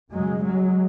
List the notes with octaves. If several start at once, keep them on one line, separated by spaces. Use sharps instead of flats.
F#2 C#3 F#3 G#3
F#3 G#3